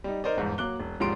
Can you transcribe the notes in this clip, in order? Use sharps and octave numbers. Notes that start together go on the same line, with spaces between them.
G3 D#4
D#4 A#4 C5 D5 D#5
G1 E2 G#2
F#3 A#3 D6 F#6 G7
E1
D#1 G#2 F3 G3 C6 D7